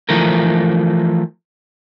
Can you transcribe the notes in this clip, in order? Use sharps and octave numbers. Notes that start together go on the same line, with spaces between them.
E3 F3 A3 A#4